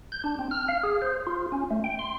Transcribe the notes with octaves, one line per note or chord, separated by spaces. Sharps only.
G6
D4
C4
F6
F5
G#4
C5
F4
C#4
A3
G5
C6